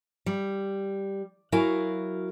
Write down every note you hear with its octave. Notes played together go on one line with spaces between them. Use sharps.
G3
F#3 E4 F#4 A#4 F5 G#5